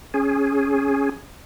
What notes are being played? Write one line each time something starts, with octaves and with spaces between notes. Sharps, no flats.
C#4 G#4